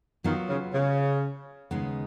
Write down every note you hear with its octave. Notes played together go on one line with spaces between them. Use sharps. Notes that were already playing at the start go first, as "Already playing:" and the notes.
D#3 F#3 B3 F4
C#3
C#3
D#2 C#3 G#3 B3 D#4